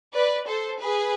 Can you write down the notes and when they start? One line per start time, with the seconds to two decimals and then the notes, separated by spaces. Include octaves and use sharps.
0.14 B4 D5
0.47 A4 C5
0.81 G#4 B4